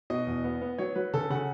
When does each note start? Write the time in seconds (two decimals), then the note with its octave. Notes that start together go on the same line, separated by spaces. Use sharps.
0.10 B2 D#5
0.27 E2
0.44 B3
0.61 B3
0.78 F#3 C#5
0.95 F#3 B4
1.13 C#3 A4
1.30 C#3 F#5